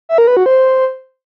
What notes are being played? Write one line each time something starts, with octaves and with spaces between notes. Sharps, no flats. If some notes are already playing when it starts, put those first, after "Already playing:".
E5
A#4
B4
F#4
C5